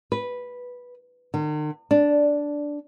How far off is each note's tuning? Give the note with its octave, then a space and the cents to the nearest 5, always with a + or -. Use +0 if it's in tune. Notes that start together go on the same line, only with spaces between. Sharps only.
B4 -5
D#3 -45
D4 -5